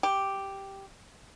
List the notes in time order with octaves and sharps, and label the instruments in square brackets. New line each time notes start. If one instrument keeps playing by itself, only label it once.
[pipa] G4